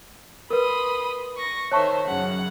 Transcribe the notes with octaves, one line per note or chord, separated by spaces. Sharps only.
A#4 B4 B5 C6 D#6
C#6 A#6
D#3 C5 C#5 E5 A5 C#6
F#2 C#3 F#5